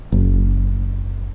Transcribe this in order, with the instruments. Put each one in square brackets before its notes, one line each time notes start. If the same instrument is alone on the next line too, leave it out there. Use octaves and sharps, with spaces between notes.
[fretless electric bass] F#1